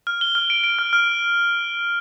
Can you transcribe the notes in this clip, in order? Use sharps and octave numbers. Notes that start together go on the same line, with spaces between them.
F6
G7
F6
D7
D7
F6
F6